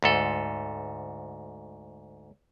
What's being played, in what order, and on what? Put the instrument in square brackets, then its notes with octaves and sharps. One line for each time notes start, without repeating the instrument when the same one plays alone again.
[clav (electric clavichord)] D2 G#2 A4